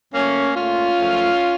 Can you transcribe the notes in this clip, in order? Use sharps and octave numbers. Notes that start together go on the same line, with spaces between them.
F#2 C#3 A3 A#3 C#4
A#2 A3 C#4 F4
F#2 F3 A3